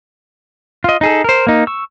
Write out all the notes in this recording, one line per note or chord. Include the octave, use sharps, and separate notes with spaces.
F4 D#5
D#4 G#4 A4
A#4 C5
A#3 D#4
C#6 E6